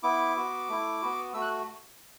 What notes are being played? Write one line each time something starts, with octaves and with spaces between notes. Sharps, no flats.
B3 E4 D6
B3 F#4
A3 E4
B3 F#4
A3 F#4 E6
F#6